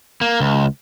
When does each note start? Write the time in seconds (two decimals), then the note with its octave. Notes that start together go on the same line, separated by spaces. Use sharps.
0.21 A#3
0.40 C#2